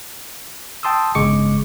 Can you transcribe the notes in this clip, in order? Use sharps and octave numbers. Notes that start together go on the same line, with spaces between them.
G5 A5 C6 D#6 E6
G1 C#3 G#3 C#6 D6 C#7